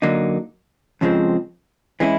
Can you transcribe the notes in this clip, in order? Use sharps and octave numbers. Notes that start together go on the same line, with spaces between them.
F#2 D3 F#3 A#3 D#4
F2 C#3 F3 G#3 C4
E3 G#3 C#4 E4